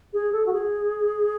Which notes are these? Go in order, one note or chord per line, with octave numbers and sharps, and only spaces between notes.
G#4
A4
F#4
G#4